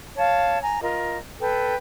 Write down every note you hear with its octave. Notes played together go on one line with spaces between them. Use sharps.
C#5 F5 A5
G#5 A#5
F4 A#4 D#5
A4 B4 G5